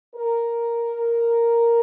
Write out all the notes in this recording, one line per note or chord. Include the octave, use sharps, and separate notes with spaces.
A#4